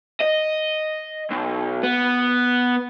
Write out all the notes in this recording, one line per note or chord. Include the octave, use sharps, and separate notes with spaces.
D#5
B1
B3